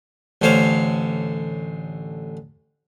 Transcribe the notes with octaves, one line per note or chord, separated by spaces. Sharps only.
A1 D3 C5 C#5 F5